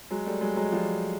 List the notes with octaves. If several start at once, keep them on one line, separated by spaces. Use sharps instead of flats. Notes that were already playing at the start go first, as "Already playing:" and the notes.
F#3 G#3
G3 A3
F#3 G#3
F#3 G#3
F3 G3